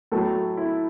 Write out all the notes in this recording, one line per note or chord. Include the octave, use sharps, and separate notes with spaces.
A2 F#3 A3 A4
E4